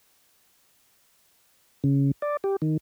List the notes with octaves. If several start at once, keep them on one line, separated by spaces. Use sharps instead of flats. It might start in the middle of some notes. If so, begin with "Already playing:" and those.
C#3
D5
G4
D#3